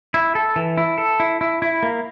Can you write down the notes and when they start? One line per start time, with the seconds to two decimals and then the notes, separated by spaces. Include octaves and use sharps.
0.14 E4
0.35 A4
0.56 E3
0.77 E4
0.98 A4
1.20 E4
1.41 E4
1.62 E4
1.83 A#3